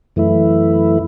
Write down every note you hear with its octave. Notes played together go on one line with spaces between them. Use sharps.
F#2 E3 A3 E4